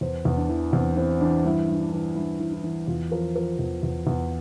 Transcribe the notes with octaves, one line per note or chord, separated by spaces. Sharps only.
E2 C5
E2
D4
E3
E2 C4
E3 C4
E3 D4
G2 E4
G2
D4
E3
G2 E4
E3
E4
E3
E2 F4
F3 A#4
F3 A#4
E2
E2
E2